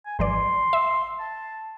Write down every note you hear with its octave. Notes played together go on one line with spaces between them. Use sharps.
G#5
G#1 E3 D5 C6
E5
A5